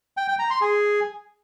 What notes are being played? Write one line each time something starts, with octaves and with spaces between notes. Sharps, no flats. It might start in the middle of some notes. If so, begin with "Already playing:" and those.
G5
G5
A#5
C6
G#4